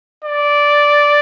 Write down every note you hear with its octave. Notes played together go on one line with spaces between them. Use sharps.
D5